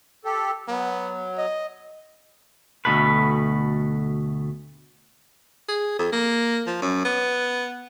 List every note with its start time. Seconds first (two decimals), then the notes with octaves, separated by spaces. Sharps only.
0.25 G4 A4
0.68 F#3 B3
1.38 D#5
2.85 D2 B2 A3 B4
5.68 G#4
5.99 F2
6.13 A#3
6.67 F3
6.82 F#2
7.05 B3